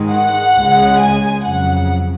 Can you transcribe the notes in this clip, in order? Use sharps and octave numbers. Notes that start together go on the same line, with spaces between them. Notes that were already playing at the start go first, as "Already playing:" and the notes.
Already playing: G#2 D#3 G#3
F#5
C#2 C#3 G#3
G#5
F2 C#3 F#3 F#5